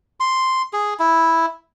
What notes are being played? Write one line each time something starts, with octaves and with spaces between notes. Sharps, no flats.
C6
G#4
E4